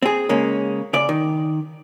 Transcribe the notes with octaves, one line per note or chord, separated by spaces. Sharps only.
C4 G#4
C#3 G#3 A#3 C#4
C#3 D5
D#3